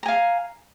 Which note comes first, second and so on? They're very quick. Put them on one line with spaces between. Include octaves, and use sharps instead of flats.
A#5 G#5 F5